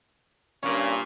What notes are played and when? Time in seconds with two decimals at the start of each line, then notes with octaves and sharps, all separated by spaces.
0.63 G2 A#2 C#4